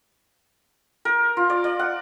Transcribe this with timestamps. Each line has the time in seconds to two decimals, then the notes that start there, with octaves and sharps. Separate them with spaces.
1.05 A#4
1.37 F4
1.50 D5
1.64 D5
1.79 F#5